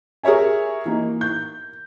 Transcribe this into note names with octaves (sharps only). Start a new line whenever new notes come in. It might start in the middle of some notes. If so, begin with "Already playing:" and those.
G#4 A#4 C#5 E5 G#5
E3 A#3 D#4
G6